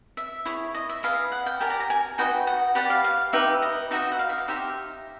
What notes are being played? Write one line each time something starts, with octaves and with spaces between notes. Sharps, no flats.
E5
E4 G#4 C#5
D#5
E5
G#4 B4 D#5 F5
F#5
G5
G4 A#4 D5 G#5
A#5
A#5
G#5
D#4 F#4 B4 D#5 G5
F#5
G4 B4 D5 F#5
F5
F5
D#4 G4 B4 E5
D#5
D#4 F#4 B4 D#5 E5
F#5
F5
E5
F5
D#4 G4 C5 E5